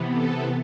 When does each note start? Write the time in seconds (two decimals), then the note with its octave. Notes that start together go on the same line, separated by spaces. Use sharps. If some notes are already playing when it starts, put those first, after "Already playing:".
Already playing: C3 E3 B3
0.13 A4